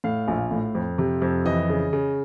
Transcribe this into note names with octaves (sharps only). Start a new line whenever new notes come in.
A2 F5
A#1
A2
F2
C3
F2
E3 D#5
C#3
C#3